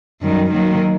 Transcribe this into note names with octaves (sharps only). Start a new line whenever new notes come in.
F#2 D#3 G3
D#3 F#3 A#3